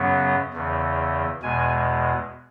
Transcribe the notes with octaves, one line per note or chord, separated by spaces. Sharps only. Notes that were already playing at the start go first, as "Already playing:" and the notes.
Already playing: F#2 C#3 F#3 B3
E2 C#3 E3
E2 B2 G#3 G#5